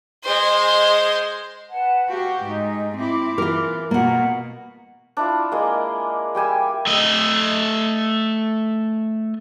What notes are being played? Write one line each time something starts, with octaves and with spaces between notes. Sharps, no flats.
G#3 C5
B4 F#5 A5
F#4 G4 F5
G#2 D#4
C4 E4 D6
E3 F4 A#4
B2 A#3 F4 F#5 A#5
D4 E4 F4
G#3 A#3
G3 G4 G#5 E6
A3 D#5